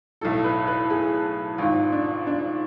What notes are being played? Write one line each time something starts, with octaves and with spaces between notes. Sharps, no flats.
B1 A2 A4
B4
B4
G#4
G#1 G#2 F4
D4
D4